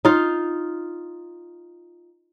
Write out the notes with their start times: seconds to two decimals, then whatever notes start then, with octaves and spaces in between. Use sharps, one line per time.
0.05 D#4 F4